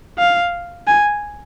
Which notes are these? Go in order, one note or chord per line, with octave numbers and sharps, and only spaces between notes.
F5
G#5